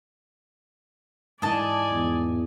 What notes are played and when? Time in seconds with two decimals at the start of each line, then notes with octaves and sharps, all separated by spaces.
1.42 G#2 E3 D5 D#5 G#5 A5
1.91 E2